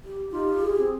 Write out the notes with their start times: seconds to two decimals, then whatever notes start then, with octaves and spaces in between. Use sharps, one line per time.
0.04 G4
0.31 D#4 F4 G4
0.61 G#4
0.78 C4